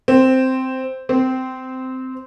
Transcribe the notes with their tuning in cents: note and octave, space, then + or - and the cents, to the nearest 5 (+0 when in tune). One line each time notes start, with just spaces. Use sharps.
C4 -5
C4 -15